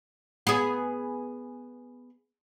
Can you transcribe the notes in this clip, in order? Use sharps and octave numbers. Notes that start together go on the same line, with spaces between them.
B3 G#4